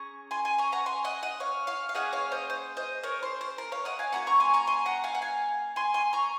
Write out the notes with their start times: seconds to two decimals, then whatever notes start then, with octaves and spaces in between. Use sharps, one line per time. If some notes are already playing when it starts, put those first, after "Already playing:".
Already playing: C#4 G#4 A#5 C#6
0.31 G#5 C6
0.45 G#5 C6
0.58 A#5 C#6
0.72 F#5 A#5
0.86 G#5 C6
1.04 D#5 F#5
1.23 D#5 F#5
1.40 C#5 F5
1.67 C#5 F5
1.89 F5
1.94 A#3 C#4 G#4 D#5 F#5
2.13 C#5 F5
2.32 C5 D#5
2.50 C5
2.77 C5 D#5
3.03 A#4 C#5
3.23 C5
3.41 C5
3.58 A#4
3.72 C#5 F5
3.85 D#5 F#5
3.99 F5 G#5
4.13 A#3 C#4 F#4 F#5 A#5
4.27 A#5 C#6
4.40 G#5 C6
4.54 A#5 C#6
4.67 G#5 C6
4.85 F#5 A#5
5.04 F5 G#5
5.15 F#5
5.22 F5 G#5
5.76 G#5 C6
5.94 G#5 C6
6.13 A#5 C#6